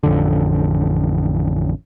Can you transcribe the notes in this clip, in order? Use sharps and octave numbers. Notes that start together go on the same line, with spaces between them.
A1 F2 D3